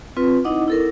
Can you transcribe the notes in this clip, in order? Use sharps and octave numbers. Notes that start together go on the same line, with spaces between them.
C4 F4 B4
D#4 E4 D#5 F#5 D6
E4 A4 A#4